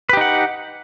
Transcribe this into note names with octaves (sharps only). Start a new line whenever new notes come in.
D#4 G4 B4 F#5